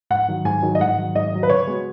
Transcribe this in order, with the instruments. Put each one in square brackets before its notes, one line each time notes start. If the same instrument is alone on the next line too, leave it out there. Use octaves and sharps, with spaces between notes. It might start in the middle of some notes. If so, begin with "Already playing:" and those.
[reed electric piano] G#2 [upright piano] F#5
[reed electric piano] D#3 F#3
[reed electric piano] G#2 [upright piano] G#5
[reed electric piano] D#3 F#3
[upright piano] D#5
[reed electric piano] G#2 [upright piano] F#5
[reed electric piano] D#3 F#3
[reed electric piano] G#2 [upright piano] D#5
[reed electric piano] D#3 F#3
[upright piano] B4
[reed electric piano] C#3 [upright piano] C#5
[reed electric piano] G#3 B3 F#4